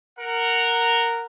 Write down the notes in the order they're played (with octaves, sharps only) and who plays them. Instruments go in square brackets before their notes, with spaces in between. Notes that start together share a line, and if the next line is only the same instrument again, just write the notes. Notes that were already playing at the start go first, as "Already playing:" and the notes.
[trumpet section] A#4 F#5